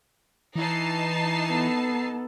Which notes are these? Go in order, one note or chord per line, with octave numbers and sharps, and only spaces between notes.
E3 D#4 A5 C7
B3 A4